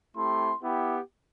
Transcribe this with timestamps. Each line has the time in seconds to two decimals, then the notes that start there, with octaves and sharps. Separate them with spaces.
0.17 A3 C4 E4 G4 C6
0.63 B3 E4 G4